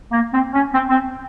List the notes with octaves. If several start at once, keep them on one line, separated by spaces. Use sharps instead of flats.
A#3
C4
C#4
C4
C4